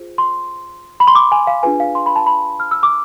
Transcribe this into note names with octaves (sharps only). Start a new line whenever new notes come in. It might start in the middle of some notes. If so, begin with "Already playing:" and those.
Already playing: F4 G#4 C5
C6
B5
C6
D6
G#5
F5
D4 F4 G#4 B4 G#5
F5
C6
B5
A5
B5
F6
E6
D6